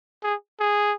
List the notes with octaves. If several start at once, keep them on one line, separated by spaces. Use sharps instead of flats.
G#4
G#4